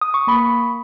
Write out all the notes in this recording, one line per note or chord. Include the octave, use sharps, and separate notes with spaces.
D#6
C#6
A#3 B5